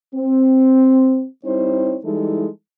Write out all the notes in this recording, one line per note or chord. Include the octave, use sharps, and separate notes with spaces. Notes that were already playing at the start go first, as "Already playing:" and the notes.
C4
G3 C4 D#4 E4 C5 C#5
E3 G3 G#3 D#4 E4 A4